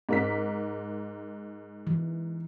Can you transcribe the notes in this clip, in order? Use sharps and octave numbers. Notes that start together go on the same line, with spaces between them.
G#2 A#4 B6
E3